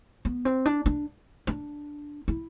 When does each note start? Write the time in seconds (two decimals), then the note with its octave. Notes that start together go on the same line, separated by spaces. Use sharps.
0.25 B3
0.45 C4
0.66 D4
0.86 D4
1.47 D4
2.28 E4